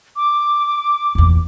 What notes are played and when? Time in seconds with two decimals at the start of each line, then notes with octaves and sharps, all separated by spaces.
0.16 D6
1.15 E2 A#2